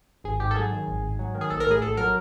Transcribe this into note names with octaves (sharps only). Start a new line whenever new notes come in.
G#1 G#4
G#2 G4
A4
F#3 G#4
D#3
G#1
G#2
F#3
D#3
G#4
A#1 A4
A#4
A2 G#4
A#1 A4
F#3 A#4